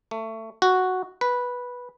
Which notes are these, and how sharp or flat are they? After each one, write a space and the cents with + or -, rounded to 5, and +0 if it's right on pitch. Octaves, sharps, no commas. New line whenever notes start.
A3 +20
F#4 +0
B4 -10